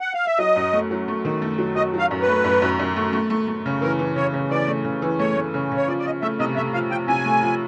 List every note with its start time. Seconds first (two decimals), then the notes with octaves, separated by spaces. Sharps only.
0.01 F#5
0.14 F5
0.26 E5
0.38 F#3 D#5
0.56 F#2
0.73 A3
0.91 F#3
1.08 A3
1.25 D#3
1.42 A3
1.58 F#3
1.76 F#3 D#5
1.94 F#3
1.99 F5
2.11 F#2
2.22 B4
2.28 A3
2.44 F#2
2.62 F#2
2.80 F#2
2.96 A3
3.13 A3
3.30 A3
3.48 A3
3.66 C#3
3.82 E3 A#4
3.99 E3
4.16 C#3 C#5
4.34 C#3
4.51 E3 D5
4.68 A3
4.85 C#3
5.02 E3
5.19 A3 C#5
5.37 A3
5.54 C#3
5.72 C#3
5.77 C#5
5.88 F3 D5
5.99 D5
6.05 F3 D#5
6.22 A3 E5
6.40 C3 D#5
6.56 A3 E5
6.74 F3 F5
6.91 F3 G5
7.08 C3 G#5
7.25 A3
7.42 F3